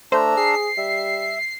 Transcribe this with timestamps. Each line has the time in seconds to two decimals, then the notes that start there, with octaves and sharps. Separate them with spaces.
0.12 A3 D4 C5 A#5 E6
0.37 G#4 C7
0.78 G3 E5